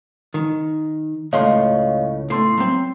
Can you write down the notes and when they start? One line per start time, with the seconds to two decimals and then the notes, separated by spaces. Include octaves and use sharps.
0.34 D#3
1.33 C#2 A2 C#5 D#5 F5 C6
2.30 A2 B3 C6 C7
2.58 F#3 C4